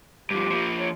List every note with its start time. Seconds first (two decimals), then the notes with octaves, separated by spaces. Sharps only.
0.31 G2 F3 G4
0.51 F3 A#3
0.79 C#5